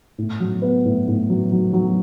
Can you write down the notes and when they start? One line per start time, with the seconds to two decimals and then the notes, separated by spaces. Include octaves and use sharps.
0.18 A2
0.40 F#3
0.62 B3
0.85 A2
1.08 A2
1.29 F#3
1.52 F#3
1.73 F#3